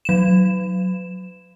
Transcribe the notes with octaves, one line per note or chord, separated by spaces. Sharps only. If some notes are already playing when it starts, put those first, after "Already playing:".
F#3 E7